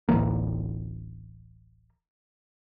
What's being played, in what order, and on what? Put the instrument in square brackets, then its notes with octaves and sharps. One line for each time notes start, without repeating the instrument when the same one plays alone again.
[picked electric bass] D1 A1 E3 A#3